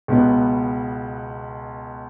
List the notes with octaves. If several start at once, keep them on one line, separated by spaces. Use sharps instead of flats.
C#2 B2 B3